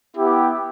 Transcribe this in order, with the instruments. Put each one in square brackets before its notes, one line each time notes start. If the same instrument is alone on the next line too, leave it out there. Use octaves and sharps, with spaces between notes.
[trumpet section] B3 E4 G4